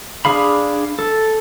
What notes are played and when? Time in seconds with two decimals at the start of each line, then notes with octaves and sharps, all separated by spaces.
0.25 D4 G#4 F5 B5
0.99 A4